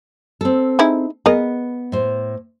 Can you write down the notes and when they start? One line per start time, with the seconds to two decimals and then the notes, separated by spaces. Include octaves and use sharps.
0.41 C4 A4
0.79 D#4 E4 G#4
1.26 B3 G#4 A#4 D#5
1.92 A2 C5